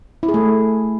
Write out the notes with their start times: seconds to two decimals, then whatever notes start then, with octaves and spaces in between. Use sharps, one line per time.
0.23 E4
0.28 G#4
0.34 A3